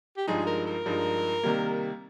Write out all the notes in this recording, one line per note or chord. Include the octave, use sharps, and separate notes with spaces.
G4
G2 F3 G#3 D#4 G#4
A#4
A#4
G2 F3 G#3 D#4
C3 D#3 G3 A#3